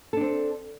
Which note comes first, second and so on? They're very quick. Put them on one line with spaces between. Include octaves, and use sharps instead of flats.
A4 D4 C4